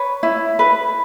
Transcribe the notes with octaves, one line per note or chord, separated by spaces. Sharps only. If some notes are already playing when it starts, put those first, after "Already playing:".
Already playing: B4 C#5
E4
B4